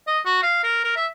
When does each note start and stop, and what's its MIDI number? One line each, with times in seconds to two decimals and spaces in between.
0.07 0.19 75
0.25 0.42 66
0.42 0.58 77
0.63 0.79 70
0.84 0.93 70
0.96 1.06 76